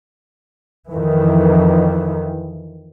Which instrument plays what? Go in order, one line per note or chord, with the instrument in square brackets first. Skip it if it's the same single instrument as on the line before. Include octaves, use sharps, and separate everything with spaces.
[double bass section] F2 D#3 E3